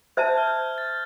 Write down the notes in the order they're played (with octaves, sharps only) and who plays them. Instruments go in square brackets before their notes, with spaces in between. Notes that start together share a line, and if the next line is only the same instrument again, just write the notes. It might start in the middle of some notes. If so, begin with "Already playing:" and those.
[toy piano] C5 E5 A5 [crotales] G#6
[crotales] G6
F6
G6
G#6
A6